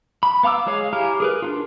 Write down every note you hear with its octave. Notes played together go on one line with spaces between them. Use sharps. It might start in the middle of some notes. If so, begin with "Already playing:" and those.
B5
B3 F5 A#5 D6 E6
G#3 G#4 C#5 F5
E4 G4 G#5 A#5 F6
G#4 A#4 B4
D4 D#4 F4